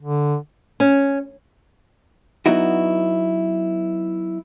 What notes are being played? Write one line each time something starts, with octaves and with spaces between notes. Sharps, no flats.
D3
C#4
F#3 B3 D#4 E4 F#4